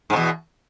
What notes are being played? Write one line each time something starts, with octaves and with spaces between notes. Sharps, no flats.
E2 G#2 B2